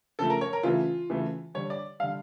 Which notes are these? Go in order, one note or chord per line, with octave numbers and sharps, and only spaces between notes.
C#3 F3 A3 A4
A#4
C#5
A#4
C#3 E3 A3 F4
C#3 E3 A3
D3 G3 C#5
D5
D3 G3 F5